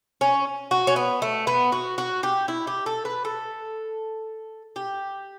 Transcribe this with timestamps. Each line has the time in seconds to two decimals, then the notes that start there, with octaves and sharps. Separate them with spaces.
0.21 C#4
0.71 F#4
0.87 C#4
0.96 B3
1.22 A3
1.47 B3
1.72 F#4
1.98 F#4
2.23 G4
2.48 E4
2.67 G4
2.86 A4
3.05 B4
3.25 A4
4.76 G4